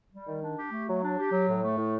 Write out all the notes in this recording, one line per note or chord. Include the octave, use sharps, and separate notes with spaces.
G3
D#3
D4
G4
A3
F#3
D4
G4
F#3
A2
A3
A2